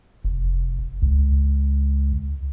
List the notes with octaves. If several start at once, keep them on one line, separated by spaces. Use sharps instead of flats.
F1
C#2